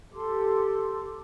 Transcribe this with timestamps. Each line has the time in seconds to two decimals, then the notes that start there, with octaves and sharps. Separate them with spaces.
0.13 G4 A4 C6 D6